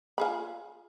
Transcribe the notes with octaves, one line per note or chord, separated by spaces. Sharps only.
F4 G#4 B5